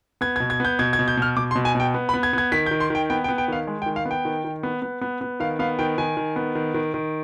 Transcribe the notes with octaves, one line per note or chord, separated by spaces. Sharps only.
B3 G#6
G#6
B2
G#6
B3 G6
B2 G#6
G#6
B2
G6
B2 F6
B2 D6
C6
B2
G#5
B2 G5
B3
B5
B3
G#6
B3 G#6
D#3 B6
G6
D#3
C6
D#3 G5
B3 G5
G5
B3
G5
D#3 F5
G#3
G5
D#3
F5
B3
G5
D#3
D#3
B3
B3
B3
B3
D#3 F5
B3 F5
D#3 G5
D#3 G#5
D#3
B3
D#3
D#3
D#3